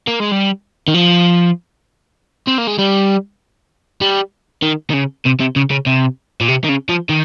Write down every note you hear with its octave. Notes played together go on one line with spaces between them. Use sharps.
A#3
G#3
G3
D#3
F3
C4
A#3
G#3
G3
G3
D#3
D#3
C#3
C3
C3
C#3
C#3
C3
A#2
C3
D#3
C#3
F3
D#3